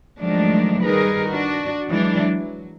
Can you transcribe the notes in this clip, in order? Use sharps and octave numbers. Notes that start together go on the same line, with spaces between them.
D#3 F3 F#3 G#3 A3 D4
D#3 G3 D#4 G#4 A#4 B4
D4 F#4
E3 F#3 G#3 D4
F#3